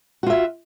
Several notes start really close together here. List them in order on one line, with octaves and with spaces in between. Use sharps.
F#4 F4 E5